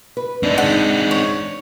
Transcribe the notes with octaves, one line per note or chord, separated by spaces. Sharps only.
B4
C4 D4 D#4
G#2 F#5
C#5